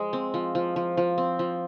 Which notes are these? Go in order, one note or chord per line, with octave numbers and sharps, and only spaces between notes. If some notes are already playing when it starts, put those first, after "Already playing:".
Already playing: F3 G#3
C4
F3
F3
F3
F3
C4
F3